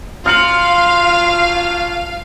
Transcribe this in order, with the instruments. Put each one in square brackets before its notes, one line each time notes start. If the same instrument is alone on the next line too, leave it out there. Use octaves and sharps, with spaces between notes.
[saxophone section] F3 F#3 F4 [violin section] F5 [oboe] C6 [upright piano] F6 C#7 F#7